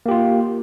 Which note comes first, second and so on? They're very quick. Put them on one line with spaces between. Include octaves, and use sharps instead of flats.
A#3 G4 F4